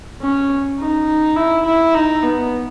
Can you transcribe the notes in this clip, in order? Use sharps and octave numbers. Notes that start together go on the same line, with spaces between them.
C#4
D#4
E4
E4
D#4
B3